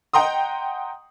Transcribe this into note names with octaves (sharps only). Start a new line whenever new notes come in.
D#5 F#5 G5 A#5 C6 D#6